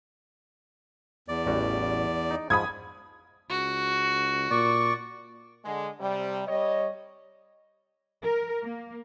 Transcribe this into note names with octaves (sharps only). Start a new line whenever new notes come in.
E2 D5
A1 G3 F#4
D#4
G#2 F3 B5 D#6 G#6
C#2 F#4
A#2 D5 C#6
D3 G#3
C3 G3
G3 C#5 D#5
A#4
A#3